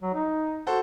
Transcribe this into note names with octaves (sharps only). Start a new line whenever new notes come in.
F#3
D#4
F#4 A4 C5